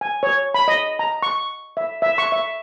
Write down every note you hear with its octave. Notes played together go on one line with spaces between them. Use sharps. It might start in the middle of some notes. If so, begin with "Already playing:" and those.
G#5
C#5
B5
D#5
A#5
C#6
E5
E5
C#6
E5